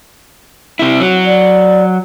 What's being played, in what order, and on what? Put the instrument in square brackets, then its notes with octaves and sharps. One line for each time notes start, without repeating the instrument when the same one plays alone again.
[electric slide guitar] C3 E4
F#3
[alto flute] D5